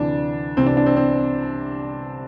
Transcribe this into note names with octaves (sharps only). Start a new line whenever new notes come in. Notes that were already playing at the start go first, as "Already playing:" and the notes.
Already playing: D2 C3 E3 D4
C2 C3 E3 C4
D4
D4
C4
C4